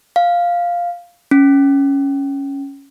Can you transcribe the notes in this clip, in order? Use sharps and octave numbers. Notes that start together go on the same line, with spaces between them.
F5
C#4